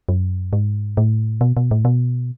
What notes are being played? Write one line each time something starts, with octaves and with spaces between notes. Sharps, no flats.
F#2
G#2
A2
B2
B2
A2
B2